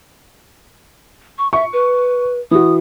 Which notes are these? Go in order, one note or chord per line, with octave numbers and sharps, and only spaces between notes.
C#6
E5 C#6
B4
E3 F#4 D#6